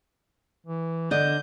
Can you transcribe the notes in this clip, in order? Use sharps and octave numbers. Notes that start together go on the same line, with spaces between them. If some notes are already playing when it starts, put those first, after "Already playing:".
E3
D3 D4 D#5 G6